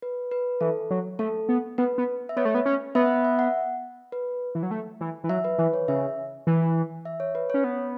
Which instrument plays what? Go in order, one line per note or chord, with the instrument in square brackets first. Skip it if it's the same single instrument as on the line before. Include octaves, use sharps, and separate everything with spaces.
[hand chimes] B4
B4
[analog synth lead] E3 [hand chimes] A4
[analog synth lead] F#3
[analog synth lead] A3 [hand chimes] A4
[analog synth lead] B3
[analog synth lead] B3 [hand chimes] B4
[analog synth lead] B3
[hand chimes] E5
[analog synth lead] B3 [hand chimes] C#5
[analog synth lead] A3
B3
C#4
[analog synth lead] B3 [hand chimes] E5
[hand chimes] E5
F#5
B4
[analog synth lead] E3
F#3
A3
E3
E3
[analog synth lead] F#3 [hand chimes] E5
[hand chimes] B4
[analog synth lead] E3 [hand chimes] B4
[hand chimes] C#5
[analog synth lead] C#3 [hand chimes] E5
[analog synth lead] E3
[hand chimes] E5
C#5
B4
[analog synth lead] C#4 [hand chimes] C#5
[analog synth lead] B3